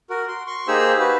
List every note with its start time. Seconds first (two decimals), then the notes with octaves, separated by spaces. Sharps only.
0.10 F#4 A#4
0.28 C6
0.47 C6 C#6
0.68 A#3 D#4 G4 G#4 C5 E6
1.00 F#4 B4